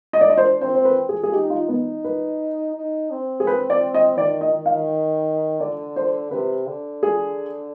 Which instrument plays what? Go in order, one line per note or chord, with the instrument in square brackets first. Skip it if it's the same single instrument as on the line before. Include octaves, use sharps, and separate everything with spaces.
[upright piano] D#5
D5
[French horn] D4 [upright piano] D#5
[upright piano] C5
[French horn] C4 [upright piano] C5
[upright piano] C5
B4
G#4
G#4
[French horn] D#4 [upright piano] G4
[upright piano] F4
[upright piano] B3 [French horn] D#4
[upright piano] B4
[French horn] D#4
C4
[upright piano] G#4
B4
D5
D#5
[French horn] D#3 [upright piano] D5
[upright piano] D#5
[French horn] D#3
[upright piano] F5
[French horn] D3 [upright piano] D5
[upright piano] C5
[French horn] C3 [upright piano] B4
[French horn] D3
[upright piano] G#4